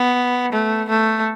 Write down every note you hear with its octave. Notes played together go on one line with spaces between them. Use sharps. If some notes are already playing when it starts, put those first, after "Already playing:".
Already playing: B3
A3
A3